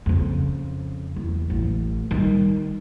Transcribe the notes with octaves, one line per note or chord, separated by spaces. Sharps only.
F2 C#3
E2
A1
D#3 G3